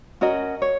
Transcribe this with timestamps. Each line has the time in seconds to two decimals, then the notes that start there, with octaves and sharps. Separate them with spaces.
0.21 C#4 F#4 A#4 D#5
0.62 C#5